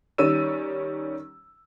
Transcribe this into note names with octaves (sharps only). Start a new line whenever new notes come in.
D#3 G3 C#4 E6 D#7